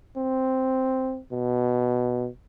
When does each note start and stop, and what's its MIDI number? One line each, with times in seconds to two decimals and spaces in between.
0.17 1.20 60
1.31 2.28 47